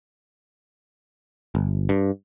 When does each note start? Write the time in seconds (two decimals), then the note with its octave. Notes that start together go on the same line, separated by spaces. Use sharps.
1.55 G1
1.89 G2